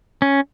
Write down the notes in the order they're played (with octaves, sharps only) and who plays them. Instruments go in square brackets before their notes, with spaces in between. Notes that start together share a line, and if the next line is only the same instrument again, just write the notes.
[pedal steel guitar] C#4